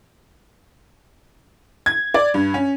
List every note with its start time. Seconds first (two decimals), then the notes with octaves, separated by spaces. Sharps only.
1.86 G#6
2.14 D5
2.34 G2
2.54 C#4